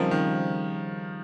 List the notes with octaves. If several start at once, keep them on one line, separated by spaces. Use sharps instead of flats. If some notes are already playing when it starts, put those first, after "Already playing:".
Already playing: C#3 F3 G3 C4 D#4 A#4
D#3